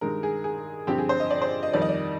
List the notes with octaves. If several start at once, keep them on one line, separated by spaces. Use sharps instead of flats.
G2 D#3 G#3 A#4
G#4
G#4
G2 D3 F3 C4 G4
G#4
C5
D#5
D5
C5
D#5
F2 D#3 G3 D5
D#5
D5